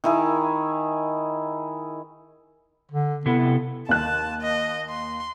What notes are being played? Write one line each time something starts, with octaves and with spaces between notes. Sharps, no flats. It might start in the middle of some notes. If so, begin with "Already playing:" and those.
D#3 E4 G#4
D3
C3 B3 E4 A4
D#2 A5 F#6
D#5
C6